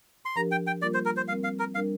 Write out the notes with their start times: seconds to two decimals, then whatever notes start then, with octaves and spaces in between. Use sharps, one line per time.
0.25 C6
0.36 F3 D4 G4 A#4 A#5
0.51 G5
0.67 G5
0.82 G3 A#3 F4 A#4 D5
0.94 C5
1.05 A#4
1.17 C5
1.28 G3 C4 A#4 F5
1.44 F5
1.59 A#4
1.75 G3 D4 A#4 F5